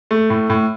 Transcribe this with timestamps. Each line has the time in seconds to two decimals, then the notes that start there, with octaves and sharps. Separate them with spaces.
0.11 A3
0.30 A2
0.50 A2